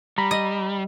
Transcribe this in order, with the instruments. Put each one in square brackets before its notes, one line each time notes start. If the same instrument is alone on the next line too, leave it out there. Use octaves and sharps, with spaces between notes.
[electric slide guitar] G3 [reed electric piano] A#5 B5
[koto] D#5